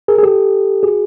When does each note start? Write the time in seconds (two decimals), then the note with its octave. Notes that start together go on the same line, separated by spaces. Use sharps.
0.08 G#4 A#4
0.19 G#4
0.23 G4 A4
0.83 F#4 G#4